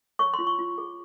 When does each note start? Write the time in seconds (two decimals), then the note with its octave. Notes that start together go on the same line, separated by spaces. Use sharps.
0.19 C#5 C#6
0.34 C6
0.39 F4
0.47 C#6
0.59 F4
0.78 G#4